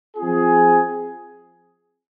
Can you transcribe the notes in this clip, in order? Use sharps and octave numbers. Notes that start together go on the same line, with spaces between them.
F3 C4 F4 G#4